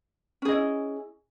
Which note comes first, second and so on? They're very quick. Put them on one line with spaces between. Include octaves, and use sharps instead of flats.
C#4 G#4 D#5 E4